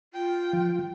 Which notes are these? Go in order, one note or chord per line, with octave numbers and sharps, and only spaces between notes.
F4 G5
F3